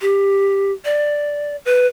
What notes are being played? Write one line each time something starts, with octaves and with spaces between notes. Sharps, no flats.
G4
D5
B4